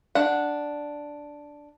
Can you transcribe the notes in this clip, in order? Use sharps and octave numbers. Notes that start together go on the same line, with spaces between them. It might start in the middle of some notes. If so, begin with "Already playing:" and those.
D4 F#5